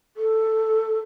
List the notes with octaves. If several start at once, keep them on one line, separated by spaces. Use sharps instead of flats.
A4